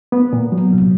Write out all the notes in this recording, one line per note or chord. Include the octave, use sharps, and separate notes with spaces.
B3
A#2
F#3
C2